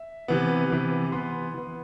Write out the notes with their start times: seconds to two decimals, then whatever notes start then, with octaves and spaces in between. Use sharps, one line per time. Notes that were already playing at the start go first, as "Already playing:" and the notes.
Already playing: E5
0.28 C3 E3 B3
0.70 C3 E3 B3
1.12 E3 B3 C6
1.54 E3 B3